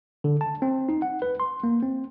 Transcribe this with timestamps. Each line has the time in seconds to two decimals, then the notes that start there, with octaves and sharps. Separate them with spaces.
0.24 D3
0.41 A5
0.62 C4
0.89 D#4
1.02 F#5
1.22 B4
1.40 C6
1.63 A#3
1.83 C4